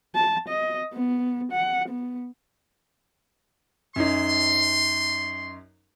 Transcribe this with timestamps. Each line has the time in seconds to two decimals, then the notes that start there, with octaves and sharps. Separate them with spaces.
0.15 A5
0.48 D#5
0.94 B3
1.52 F#5
1.89 B3
3.96 F#2 C#4 D#4 C6